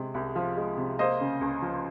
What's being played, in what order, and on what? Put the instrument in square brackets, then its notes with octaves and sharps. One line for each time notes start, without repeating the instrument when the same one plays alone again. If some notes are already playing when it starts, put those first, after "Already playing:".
Already playing: [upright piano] C3 G#3
C2
F3
G#3
C3
A#3 C5 D#5
C#3
C#2
F3